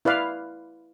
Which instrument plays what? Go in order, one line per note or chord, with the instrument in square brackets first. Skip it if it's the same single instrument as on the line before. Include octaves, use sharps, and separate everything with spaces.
[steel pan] E4 B4 D5 F5